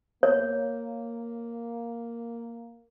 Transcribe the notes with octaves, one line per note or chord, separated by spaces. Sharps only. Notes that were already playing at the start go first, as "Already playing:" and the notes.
A#3 C#5